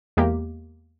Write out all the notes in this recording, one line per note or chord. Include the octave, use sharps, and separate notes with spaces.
E2 G#3 A#3 G4